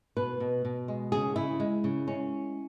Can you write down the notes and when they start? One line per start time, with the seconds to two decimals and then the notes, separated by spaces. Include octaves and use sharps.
0.17 B2 B4
0.40 B2
0.65 B2
0.88 G#3
1.12 C#3 G#4
1.36 C#3 E4
1.60 G#3
1.84 C#3
2.07 G#3 C#4